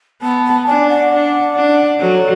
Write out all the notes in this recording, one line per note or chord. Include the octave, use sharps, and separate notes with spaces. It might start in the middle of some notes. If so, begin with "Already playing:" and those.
B3 A5
A5
D4 G#5
F#5
D4
D4
F#3 A4